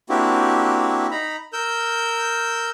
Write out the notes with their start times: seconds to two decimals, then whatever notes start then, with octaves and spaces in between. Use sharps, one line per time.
0.09 A#3 C4 D4 E4 F#4 G4
1.11 D#4 A#5 B5
1.53 A#4 E6 G6